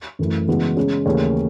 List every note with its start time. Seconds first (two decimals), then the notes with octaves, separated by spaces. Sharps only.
0.19 F#2 E3 A3 E4
0.48 C#3 E3 G#3 B3 F#4
0.77 C#3 G#3 C#4
1.06 D#2 C#3 E3 A3 C#4